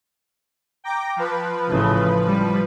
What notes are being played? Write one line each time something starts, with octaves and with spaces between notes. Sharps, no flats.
G5 A#5 D6
F3 B4
A1 C#3
G3